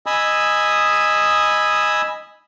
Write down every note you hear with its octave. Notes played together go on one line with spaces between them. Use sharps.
D#5 G#5 B5 D#6 E6